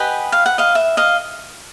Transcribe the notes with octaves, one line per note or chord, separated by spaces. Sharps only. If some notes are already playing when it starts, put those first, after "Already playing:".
Already playing: G4 B4 D#5 F#5 G#5
F5
F#5
D#5 F5
E5
D#5 F5